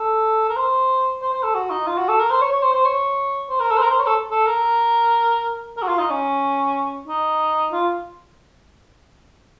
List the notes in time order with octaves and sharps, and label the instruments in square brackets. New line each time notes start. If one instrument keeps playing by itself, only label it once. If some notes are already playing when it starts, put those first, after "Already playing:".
Already playing: [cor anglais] A4
A#4
C5
C5
C5
A4
F#4
D#4
F4
F#4
A4
A#4
C5
C#5
C#5
C5
C5
C#5
C5
A#4
A4
C5
A#4
C5
C#5
A4
A4
A#4
A#4
F#4
F4
D#4
C#4
D#4
F4